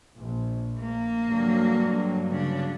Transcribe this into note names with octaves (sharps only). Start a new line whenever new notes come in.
A#1
A#3
G2 D3 F#3
C#3 D4